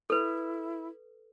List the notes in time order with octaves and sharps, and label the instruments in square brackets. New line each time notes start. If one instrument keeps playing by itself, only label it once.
[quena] E4 [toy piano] A4 B4